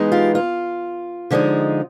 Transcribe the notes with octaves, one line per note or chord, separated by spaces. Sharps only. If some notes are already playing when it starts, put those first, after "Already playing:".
Already playing: E3 G#3 B3 D#4
F4 G4
F4
D3 F3 G#3 C4 D#4